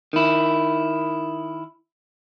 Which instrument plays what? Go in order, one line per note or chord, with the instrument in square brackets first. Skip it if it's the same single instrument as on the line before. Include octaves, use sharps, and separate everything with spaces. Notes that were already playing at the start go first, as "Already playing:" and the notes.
[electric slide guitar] D#3 E4